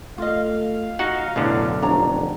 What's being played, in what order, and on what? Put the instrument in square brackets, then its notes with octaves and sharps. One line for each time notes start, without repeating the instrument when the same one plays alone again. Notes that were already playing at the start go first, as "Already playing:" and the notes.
[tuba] A3 [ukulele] F4 D#5 [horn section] F5
[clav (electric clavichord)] D#4 F#4 F#5
[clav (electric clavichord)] B1 F#2 D3 [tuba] A2
[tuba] F1 [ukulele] D4 C#5 A#5